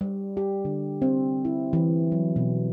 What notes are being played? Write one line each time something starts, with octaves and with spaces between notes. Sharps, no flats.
G3
G4
D3
C4
E4
E3
F#3
B2